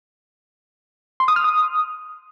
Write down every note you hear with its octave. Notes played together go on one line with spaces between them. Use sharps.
C6
D#6
F6
D#6